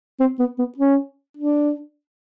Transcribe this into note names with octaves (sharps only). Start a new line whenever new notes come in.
C4
B3
B3
C#4
D4